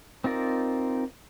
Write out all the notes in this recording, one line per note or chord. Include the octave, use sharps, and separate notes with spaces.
C4 D#4 F4 A#4 D5